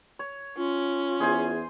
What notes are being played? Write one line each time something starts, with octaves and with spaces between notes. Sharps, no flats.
C#5
C#4 F4
E2 G#4 C5 G#5